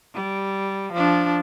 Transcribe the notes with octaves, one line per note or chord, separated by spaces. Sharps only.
G3
F3 D4